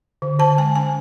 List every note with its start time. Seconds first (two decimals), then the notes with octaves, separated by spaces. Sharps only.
0.22 D3
0.39 D3 A5
0.58 G#3 G#5
0.75 C#4 G#5